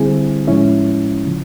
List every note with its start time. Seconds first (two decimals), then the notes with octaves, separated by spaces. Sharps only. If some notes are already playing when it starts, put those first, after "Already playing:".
Already playing: D3 G3 C4 E4 G#4
0.47 A2 F3 G#3 C#4 E4
1.26 C#3 F3